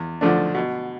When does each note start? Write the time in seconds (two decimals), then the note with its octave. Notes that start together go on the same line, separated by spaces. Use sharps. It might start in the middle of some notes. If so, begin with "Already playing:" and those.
Already playing: E2
0.21 D3 F3 A3 D4
0.55 B2